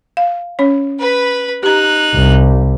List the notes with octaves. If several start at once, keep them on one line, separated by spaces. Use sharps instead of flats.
F5
C#4 C#5
B4 B5
D#4 G4 A#5 F#6
C2